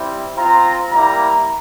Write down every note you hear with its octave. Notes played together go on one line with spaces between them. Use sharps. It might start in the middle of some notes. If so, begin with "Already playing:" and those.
Already playing: G3 C4 E4
C4 F4 A#5
G3 A#3 E4 A#5